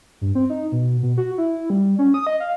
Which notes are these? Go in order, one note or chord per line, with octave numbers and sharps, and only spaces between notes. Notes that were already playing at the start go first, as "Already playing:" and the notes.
G2
C4
D#4
B2
B2
F#4
E4
G3
C#4
D#6
D#5
F5